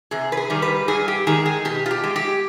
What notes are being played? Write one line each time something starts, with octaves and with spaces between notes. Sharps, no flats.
C3 G#4
B4
G#4
D#3 G3
B4
G2 G#4
G4
D#3 G#3 G#4
G#4
B2 G4
F4
G4
G#3
G4